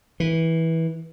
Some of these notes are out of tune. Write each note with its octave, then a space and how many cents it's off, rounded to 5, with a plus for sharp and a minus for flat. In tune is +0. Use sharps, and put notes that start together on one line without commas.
E3 -15